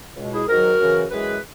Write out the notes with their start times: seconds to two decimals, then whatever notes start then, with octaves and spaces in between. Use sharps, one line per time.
0.17 C#2 B2 G#3
0.32 E4 G#4
0.48 G#2 D#3 F#3 F#4 A#4
0.79 F#2 C#3 E3
1.11 F#2 E3 G#3 G#4 B4